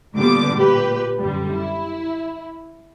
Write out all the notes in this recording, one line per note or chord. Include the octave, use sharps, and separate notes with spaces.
A#2 D3 G3 B3 D6
A#2 G4 B4
F#2 D3 G3
E4